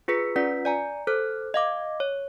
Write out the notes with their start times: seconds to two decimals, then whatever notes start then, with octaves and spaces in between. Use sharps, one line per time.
0.08 F4 G#4 B4 B6 C#7
0.36 C#4 F4 B4 D5 F#5 B6
0.65 D5 G#5 A#5
1.07 A4 C5 F6 F#6
1.54 D#5 F5 D6
2.00 C#5